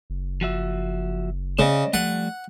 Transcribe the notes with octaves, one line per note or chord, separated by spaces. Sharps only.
F#1
F3 F#4 E5
C#3 C5 D5 D#5
F3 G3 A3 F#5